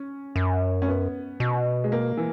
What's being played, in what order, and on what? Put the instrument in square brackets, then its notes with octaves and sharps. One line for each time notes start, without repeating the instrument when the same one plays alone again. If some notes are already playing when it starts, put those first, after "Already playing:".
Already playing: [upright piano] C#4
[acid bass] F#2
[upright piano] C#4
B3
[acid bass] B2
[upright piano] G#3
A#3
E3